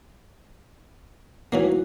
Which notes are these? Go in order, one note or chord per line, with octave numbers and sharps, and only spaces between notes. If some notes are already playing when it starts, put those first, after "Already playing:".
E3 F#3 A#3 D#4 E4 F#4